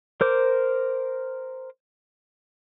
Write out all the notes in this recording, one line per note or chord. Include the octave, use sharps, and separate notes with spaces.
A#4 C5 D6